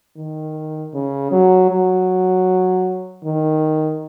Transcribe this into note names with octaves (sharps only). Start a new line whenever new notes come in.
D#3
C#3
F#3
F#3
D#3